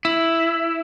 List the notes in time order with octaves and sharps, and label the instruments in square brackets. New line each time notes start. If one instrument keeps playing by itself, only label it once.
[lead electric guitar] E4